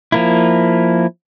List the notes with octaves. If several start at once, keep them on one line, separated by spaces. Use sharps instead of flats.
F3 A#3 E4